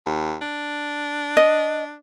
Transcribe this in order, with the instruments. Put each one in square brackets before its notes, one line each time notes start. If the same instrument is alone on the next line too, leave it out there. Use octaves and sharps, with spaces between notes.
[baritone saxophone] D#2
D4
[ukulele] D#5